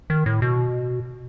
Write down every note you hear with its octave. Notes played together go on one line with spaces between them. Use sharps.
D#3
A2
B2